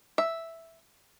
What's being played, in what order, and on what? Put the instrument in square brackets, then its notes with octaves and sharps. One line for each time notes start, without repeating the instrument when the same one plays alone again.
[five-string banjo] E5